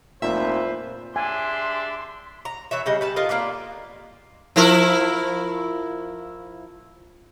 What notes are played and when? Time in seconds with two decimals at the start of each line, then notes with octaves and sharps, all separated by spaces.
0.22 F1 E2 A#2 B4 C5 E5
1.16 D4 G4 G#4 E5 G#5 C6
2.45 A#5
2.71 E3 C#5 E5
2.86 C#3 G3 D#5
3.01 G3 B4 A5
3.16 F4 A4 A#4 D#5
3.29 A#3 F4 B4 D5
4.56 F3 E4 A#4